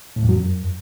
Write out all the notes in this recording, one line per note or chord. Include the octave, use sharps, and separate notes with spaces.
A2
F#2
F#3
F#2